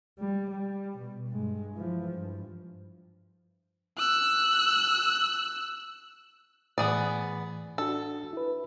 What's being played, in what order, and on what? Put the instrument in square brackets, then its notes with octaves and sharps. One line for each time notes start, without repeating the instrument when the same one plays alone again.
[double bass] G3
G3
B2
G2 G#3
E3 F3
G2
[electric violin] E6 F#6
[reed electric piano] A2 E3 [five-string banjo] B3 G#4 D5
[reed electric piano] D4 F#4 [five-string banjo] A4
[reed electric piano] E4 B4